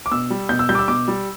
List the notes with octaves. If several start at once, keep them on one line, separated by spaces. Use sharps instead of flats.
D6
B2 E6
G3
B2 G6
E6
G3 G6
D6
E6
B2 D6
G3